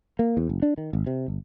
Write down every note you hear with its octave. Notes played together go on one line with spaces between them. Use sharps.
A#3
E2
F#1
D4
D#3
G#1
C3
G1